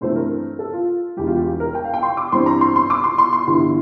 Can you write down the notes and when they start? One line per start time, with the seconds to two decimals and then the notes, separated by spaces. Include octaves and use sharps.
0.01 G2 E3 A3 C4 C5
0.15 A#4
0.59 A4
0.73 F4
1.17 E1 E2 E3 G3 G4
1.27 F4
1.35 G4
1.60 A#4
1.75 G5
1.84 F5
1.94 G5
2.03 C6
2.17 D6
2.32 G2 E3 G3 C4 C6
2.46 A#5
2.61 C6
2.76 C6
2.90 D6
3.04 C6
3.18 C6
3.33 C6
3.47 G1 G2 E3